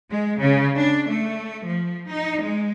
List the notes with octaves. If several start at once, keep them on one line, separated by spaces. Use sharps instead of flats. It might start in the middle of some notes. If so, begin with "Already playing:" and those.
G#3
C#3
D4
A3
F3
D#4
G#3